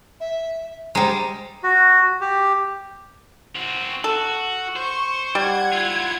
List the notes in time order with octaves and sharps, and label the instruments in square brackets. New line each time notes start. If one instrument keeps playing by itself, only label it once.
[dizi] E5
[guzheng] G3 G#3 [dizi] A#5
[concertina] F#4
G4
[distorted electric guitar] C4 F#4
[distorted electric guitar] F#4 [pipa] A4
[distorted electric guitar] C5 [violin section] C#6
[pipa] G3 [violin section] F#5 G#6
[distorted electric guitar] E4 F4